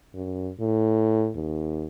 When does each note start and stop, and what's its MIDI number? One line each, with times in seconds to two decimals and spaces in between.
0.15 0.51 42
0.60 1.31 45
1.36 1.88 39